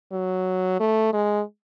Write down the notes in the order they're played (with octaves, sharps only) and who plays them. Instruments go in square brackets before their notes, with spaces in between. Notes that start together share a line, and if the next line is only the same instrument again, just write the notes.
[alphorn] F#3
A3
G#3